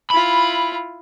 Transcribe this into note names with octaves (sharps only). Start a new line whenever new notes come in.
E4 F4 B5